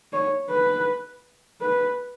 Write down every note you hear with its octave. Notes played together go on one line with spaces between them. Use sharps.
C#5
B4
B4